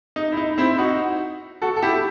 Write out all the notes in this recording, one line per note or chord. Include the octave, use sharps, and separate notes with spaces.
D#4
E4
D#4
C4 E4
D#4 F#4
F#4 A4
A4
E4 G4